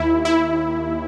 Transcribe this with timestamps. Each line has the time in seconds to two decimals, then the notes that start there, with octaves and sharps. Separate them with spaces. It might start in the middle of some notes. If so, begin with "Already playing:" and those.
Already playing: D#2 E4
0.25 E4